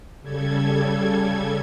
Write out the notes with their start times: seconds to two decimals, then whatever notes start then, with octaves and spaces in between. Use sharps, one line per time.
0.22 C#3 G3 A4 G#6